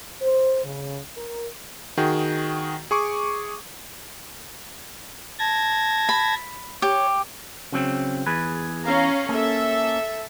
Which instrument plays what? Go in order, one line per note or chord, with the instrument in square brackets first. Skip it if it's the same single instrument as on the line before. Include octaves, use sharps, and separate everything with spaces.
[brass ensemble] C5
C#3
A#4
[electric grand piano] D#3 F#4 G#4 G5
G#4 C#6 D6
[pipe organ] A5 G#6 A#6
[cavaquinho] B5
[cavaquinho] G4 [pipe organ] C#5
[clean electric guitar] C#3 F#3 C4
E2 G#4 B4
[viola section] C#4 F5 A#5
[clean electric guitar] A#3 C#4 [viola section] A4 E5